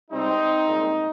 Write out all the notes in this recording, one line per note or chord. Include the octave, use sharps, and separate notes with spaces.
C#2 C3 G3 C4 D#4
C2 A#2 G#3 C4